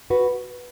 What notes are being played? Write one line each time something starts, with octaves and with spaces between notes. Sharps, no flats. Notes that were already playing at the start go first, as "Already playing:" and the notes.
F#4 B4